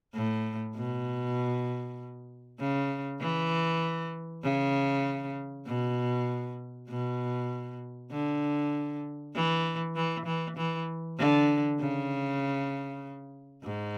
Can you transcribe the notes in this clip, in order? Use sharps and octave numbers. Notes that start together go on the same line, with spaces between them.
A2
B2
C#3
E3
C#3
B2
B2
D3
E3
E3
E3
E3
D3
C#3
G#2